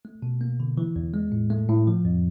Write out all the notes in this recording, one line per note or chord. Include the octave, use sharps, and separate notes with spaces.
A3
B2
A#3
D3
E3
E2
G#3
A2
A3
A2
F3
F2